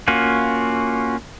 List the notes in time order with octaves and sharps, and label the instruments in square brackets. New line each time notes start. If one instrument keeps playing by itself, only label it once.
[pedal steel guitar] A#3 C#4 F4 F#4